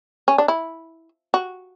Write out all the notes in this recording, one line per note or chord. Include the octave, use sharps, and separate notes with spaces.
C#4
D4
E4
F#4